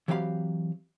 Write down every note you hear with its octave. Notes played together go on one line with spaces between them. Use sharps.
E3 F#3 C4 G4 F5 B5